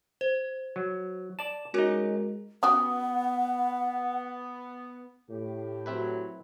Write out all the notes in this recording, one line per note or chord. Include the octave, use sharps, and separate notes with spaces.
C5
F#3
D5 A5 E7
G#3 C#4 D#4 F#4 A#4
B3 C#4 F#4 G4 F#5 D#6
A2 G4
F#3 C4 E4 B4